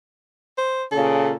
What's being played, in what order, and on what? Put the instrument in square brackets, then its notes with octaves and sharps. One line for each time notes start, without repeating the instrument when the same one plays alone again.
[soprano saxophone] C5
[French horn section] A#2 C#3 [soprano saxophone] A4